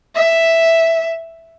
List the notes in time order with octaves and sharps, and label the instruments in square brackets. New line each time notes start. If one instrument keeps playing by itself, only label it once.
[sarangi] E5